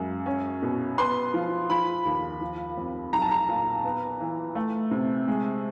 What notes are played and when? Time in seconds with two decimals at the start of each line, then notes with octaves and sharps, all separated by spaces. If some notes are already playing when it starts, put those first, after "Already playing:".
Already playing: F#2 C#3 G#3
0.26 C#4
0.62 B2
0.98 B3 C6
1.34 F3
1.70 F3 B5
2.05 D#2
2.41 F3
2.77 F2
3.13 B1 A#5
3.22 A5
3.31 A#5
3.49 A#2
3.84 B3
4.20 E3
4.55 A3
4.91 C3
5.28 G#3